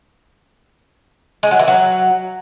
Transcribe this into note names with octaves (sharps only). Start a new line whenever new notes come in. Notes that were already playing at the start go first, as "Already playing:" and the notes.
G#3
F#3
E3
F#3